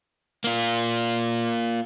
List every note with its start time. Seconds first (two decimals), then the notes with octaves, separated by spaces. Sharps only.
0.44 A#3 F4